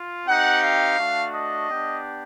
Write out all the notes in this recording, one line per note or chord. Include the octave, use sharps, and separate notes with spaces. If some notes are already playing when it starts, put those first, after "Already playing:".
Already playing: F4
C4 D#4 G4 F#5
F5
A3 D4 F#4
D#5
B3 D4 G4